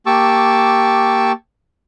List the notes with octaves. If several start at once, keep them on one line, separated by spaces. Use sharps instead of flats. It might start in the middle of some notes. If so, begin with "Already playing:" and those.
A#3 G4 A5 C#6 D6 E6